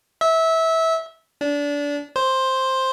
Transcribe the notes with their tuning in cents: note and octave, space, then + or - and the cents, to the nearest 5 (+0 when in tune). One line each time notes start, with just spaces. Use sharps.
E5 -20
D4 -25
C5 +5